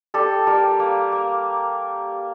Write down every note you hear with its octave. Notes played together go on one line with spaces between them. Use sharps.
G3 A4
G3 A#4
A#3
A#3